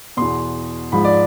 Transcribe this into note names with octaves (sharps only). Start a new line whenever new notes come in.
E2 B2 C6
G#2 F3 B5
D5